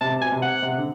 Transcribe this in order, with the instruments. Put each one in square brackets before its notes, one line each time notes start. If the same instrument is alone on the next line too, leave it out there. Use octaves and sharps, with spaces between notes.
[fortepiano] C3 [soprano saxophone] A5
[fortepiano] B2 [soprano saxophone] G#5
[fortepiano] C3
[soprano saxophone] F#5
[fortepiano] C3
D3